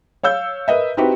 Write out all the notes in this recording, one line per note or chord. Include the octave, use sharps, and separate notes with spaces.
C#5 F5 E6 G6
A#4 B4 D#5 E5
C4 D#4 E4 F#4 G4 B4